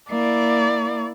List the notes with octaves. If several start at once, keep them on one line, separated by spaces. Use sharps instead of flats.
A#3 E4 D5